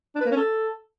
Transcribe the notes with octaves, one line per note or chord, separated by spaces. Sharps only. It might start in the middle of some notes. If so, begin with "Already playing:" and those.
D4
B4
A#3
C#4
A4